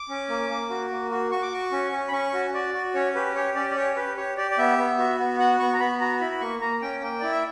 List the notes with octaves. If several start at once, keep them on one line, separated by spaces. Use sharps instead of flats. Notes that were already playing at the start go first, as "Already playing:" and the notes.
Already playing: D6
C#4
A#3
A#3
F#4
A#3
F#4
F#4 C#6
D6
F#4 C#6
C#4
C#4
B5
C#4 C#6
F#4
F#4 D5
F#4
C#4 C#5
G4 B4
G4 C#5
C#4 D5
D5
G4 C#5
G4 B4
G4 C#5
G4 D5
D5
B3 E5
B3
F#4
B3
F#4 F#5
B3 C#6
A#5
B3 B5
F#4 A#5
E4 B5
B5
A#3 C#6
A#3 A#5
C#4 G5
A#3 G5
E4 D5
E5